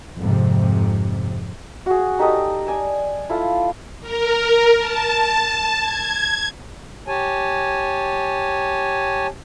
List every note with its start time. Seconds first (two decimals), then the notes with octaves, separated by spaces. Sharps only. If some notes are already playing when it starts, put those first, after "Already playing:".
0.18 F2 G#2 C3
1.86 F#4 G#4
2.19 D#4 G4 A4 D#5
2.67 D5 G#5 E6
3.29 E4 F4 A4
4.01 A#4
4.78 A5
5.78 G#6
7.08 G4 C#5 G#5 A5